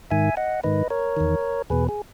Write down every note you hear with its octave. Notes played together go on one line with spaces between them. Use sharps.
G#2 D#3 E5 G#5
D#5 F#5
G#2 D#3 B4 D#5
A#4 C#5
E2 D#3
E2 B2 G#4 B4
G#4